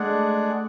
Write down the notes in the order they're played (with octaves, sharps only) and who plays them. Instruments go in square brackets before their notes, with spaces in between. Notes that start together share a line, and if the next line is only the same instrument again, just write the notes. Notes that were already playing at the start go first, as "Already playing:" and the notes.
Already playing: [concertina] G#3 D4 G#4 D5 F#5 [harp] A3